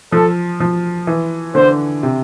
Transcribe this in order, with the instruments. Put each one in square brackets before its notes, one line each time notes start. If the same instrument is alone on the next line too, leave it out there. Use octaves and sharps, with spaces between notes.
[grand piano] F3 [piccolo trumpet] A4
[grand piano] F3
E3
[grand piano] D3 [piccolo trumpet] C5
[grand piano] C3